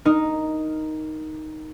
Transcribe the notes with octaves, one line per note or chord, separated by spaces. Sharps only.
D#4 A#4